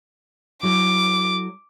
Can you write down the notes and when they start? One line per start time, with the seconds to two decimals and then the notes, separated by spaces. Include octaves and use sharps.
0.63 F#3 E4 A4 D6